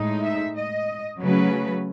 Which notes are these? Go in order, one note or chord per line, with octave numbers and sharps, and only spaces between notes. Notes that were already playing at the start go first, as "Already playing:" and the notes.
Already playing: A2 G#3 D#4
E5
D#5
C#3 F#3 A3 C#4 B4